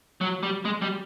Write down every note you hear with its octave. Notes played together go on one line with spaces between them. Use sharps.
F#3
G3
G#3
G3